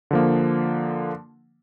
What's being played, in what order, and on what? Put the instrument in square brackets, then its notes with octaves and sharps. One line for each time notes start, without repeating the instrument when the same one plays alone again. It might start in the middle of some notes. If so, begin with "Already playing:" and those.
[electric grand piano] D3 F3 A#3